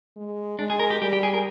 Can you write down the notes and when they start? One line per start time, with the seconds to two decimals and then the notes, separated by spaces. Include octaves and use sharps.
0.16 G#3
0.59 G#3 D4
0.70 G#4
0.80 A#4
0.90 G4
1.01 G3 G4
1.13 G4
1.23 G#4
1.34 A#4